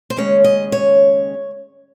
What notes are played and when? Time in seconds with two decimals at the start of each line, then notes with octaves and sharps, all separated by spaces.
0.10 C5
0.16 D#2 C#3 G#3 C#4 C#5
0.44 D#5
0.72 C#5